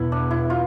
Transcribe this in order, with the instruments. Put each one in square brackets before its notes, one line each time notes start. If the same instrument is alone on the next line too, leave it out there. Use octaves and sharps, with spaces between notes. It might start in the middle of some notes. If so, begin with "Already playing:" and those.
Already playing: [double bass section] E2 B2 B3 [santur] E4
[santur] D4
E4
F4